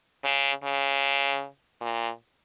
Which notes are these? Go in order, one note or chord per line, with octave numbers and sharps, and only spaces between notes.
C#3
C#3
A#2